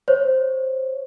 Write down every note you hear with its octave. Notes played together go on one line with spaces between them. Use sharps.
C5 C#5